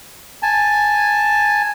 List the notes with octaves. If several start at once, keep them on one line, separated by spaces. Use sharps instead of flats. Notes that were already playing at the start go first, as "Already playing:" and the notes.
G#5 A5